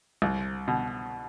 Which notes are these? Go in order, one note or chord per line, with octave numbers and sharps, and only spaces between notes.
C2
B2